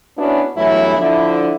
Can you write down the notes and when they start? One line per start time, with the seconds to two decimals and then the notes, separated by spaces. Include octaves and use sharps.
0.18 B3 C#4 D4 E4 F#4
0.56 G2 E3 F#3 A3 B3 E4
0.98 D3 F3 E4